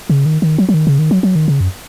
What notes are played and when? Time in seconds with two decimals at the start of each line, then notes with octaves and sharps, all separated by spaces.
0.10 C#3
0.26 D#3
0.42 D#3
0.58 F#3
0.69 F#3
0.74 D#3
0.87 C#3
0.99 D#3
1.11 F#3
1.23 F#3
1.35 D#3
1.48 C#3
1.61 F#2